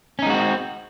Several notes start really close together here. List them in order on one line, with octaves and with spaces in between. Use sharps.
C#4 D#4 G#3 F#4 C4